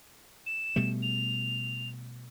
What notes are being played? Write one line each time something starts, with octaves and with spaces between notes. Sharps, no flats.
E7
B2 G3 A3
F7